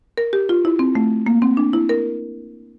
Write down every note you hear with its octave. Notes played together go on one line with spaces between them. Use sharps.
A#4
G4
F4
E4
C4
A3
A#3
C4
D4
E4
A#4